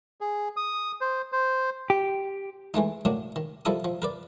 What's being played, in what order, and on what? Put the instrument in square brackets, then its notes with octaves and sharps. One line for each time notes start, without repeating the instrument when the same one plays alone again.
[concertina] G#4
D#6
C5
C5
[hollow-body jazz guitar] G4
[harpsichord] E3 G#3 A3 D#4
A2 F#3 A#3 D4
D#3
F3 G3 E4 A4 A#4 D#6
F3
A#4 B4 D5